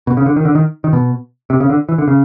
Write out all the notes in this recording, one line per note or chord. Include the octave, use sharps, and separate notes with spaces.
B2
C#3
D3
D#3
D3
D#3
D#3
B2
C3
C#3
D3
E3
D3
C#3